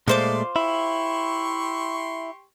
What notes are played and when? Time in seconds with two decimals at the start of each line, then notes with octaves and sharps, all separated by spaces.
0.08 A#2 G#3 A3 F4 C5 D5 C6 D6
0.56 E4 G4 C6 C#6